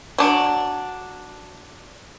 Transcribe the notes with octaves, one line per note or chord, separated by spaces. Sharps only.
F#3 D4